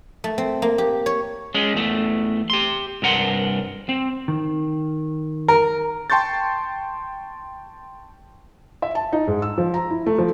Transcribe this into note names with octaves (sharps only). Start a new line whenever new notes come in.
A3
C4
A#3
G4
C#5
G#3 C#4
E2 A3
G4 C6
C2 G2 A#4 F#5 C6
C4
D#3
A#4
G5 A5 C6 C#6 G6 A6
E5
A5
D#4
G#2
E6
F3
A#5
E4
A3
F3